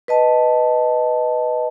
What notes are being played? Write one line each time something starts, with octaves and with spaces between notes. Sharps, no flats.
B4 D#5 A5